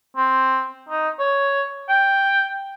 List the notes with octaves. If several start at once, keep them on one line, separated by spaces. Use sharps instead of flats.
C4
D#4
C#5
G5